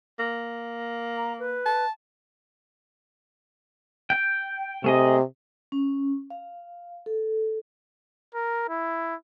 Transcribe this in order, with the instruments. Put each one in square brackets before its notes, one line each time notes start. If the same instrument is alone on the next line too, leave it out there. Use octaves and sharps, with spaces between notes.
[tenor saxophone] A#3
[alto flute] A#5
B4
[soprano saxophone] A5
[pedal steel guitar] G5
[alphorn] C3 [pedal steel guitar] A3 G#4 D#5
[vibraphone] C#4
F5
A4
[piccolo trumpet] A#4
E4